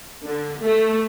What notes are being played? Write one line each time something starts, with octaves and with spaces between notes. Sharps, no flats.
D3
A3